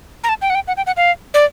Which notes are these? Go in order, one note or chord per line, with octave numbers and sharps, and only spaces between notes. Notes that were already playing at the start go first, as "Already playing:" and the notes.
A#5
A5
G5
F#5
G5
F#5
G5
F#5
F5
D5